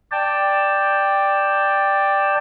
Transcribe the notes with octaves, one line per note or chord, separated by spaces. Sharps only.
D5 G5 A5